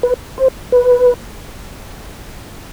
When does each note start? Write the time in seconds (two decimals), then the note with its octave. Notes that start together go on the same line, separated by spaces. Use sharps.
0.03 B4
0.38 C5
0.72 B4